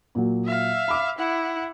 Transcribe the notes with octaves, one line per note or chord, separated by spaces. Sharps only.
A#2 F#3
E5 F5
B5 D6
E4 F#5